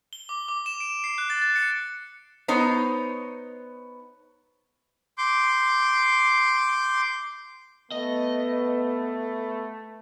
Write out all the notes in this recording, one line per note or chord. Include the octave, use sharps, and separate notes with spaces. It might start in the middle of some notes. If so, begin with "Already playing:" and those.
G7
D6
D6
E7
D7
C7
F#6
A6
A6
C#7
B3 D#4 C5 C#5
C6 D6 G6
A3 B3 D#5